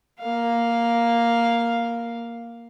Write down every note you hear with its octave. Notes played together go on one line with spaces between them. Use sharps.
A#3 F5